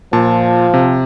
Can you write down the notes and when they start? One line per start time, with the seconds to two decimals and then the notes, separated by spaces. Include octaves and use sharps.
0.13 A#2 F3 A5
0.74 C3